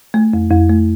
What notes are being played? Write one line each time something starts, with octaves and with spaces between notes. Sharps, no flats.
A3
F2
F2
A3